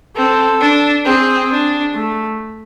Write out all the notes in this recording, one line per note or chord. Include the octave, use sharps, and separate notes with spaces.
C4 A4
D4
C4 G#4
D4
A3